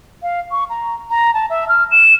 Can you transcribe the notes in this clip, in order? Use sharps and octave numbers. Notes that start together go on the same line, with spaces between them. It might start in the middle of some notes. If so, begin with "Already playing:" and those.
F5
C#6
A#5
A#5
A5
E5
F6
E7